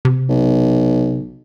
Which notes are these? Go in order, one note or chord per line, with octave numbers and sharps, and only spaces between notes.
C3
B1